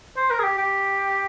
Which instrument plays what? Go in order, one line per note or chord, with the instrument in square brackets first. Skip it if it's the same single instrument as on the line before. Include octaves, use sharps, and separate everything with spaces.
[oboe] C5
A#4
G#4
G4
G4